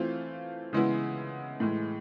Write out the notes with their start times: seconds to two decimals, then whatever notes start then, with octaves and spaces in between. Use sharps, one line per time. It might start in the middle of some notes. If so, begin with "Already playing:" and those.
Already playing: E3 A3 C4 F4
0.73 C#3 E3 G#3 B3 E4
1.60 A2 E3 G#3